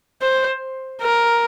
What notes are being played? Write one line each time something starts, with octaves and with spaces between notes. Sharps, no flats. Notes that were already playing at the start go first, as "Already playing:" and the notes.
C5
A#4